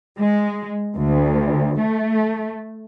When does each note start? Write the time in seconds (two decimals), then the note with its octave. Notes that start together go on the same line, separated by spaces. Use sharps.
0.18 G#3
0.95 D2
1.79 A3